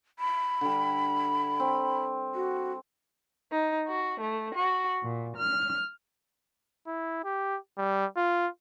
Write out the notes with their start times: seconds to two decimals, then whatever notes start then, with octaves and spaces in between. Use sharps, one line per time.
0.19 B5
0.61 D3 G3
1.60 C4
2.35 F#4
3.52 D#4
3.87 F#4
4.20 A3
4.54 F#4
5.02 A#2
5.36 F6
6.87 E4
7.24 G4
7.78 G3
8.17 F4